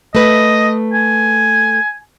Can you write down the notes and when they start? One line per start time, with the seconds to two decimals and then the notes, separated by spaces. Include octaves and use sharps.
0.15 A3 B4 D#5
0.93 G#5